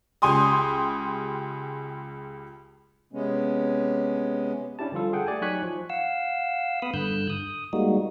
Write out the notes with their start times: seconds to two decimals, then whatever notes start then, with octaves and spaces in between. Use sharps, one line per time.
0.22 C#2 G4 G#5 C6 D#6
3.13 C3 G#3 B3 C#4
4.79 C#4 D4 E4 G4 A5
4.92 D3 F3 G3 F4 A4
5.13 G#4 A4 F#5 G5
5.27 A3 G4 D5 G#5
5.42 F#3 D#4 G#5 C#6 F#6 B6
5.63 F3
5.90 F5 F#5 E6
6.82 B3 B5 D#6
6.94 G2 D3 E6 F#6 G6
7.30 D#6
7.73 G3 G#3 A#3 D#4 F#4